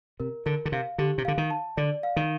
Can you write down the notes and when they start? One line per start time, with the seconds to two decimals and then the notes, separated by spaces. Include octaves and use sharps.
0.20 C3 A#4
0.46 D3 A#4
0.65 D3
0.72 C3 F5
0.98 D3 G4
1.18 C3
1.25 D3 F5
1.38 D#3
1.51 A5
1.77 D3 D5
2.03 F5
2.16 D#3